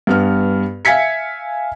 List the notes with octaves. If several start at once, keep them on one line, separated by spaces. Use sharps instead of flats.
G2 B3 F6
E5 F5 G#5 G#6 B6 C#7